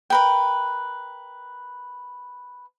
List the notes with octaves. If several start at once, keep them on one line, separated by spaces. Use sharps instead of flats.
A#4 B4 G5